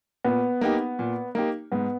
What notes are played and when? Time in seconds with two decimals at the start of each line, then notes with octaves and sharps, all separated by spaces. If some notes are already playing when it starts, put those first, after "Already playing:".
0.24 A#2 B3
0.61 A#3 D#4 G4
0.99 A#2
1.35 A#3 D#4 G4
1.72 G#2 B3